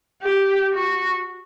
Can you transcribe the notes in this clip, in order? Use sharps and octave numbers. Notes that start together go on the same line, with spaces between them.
G4
F#4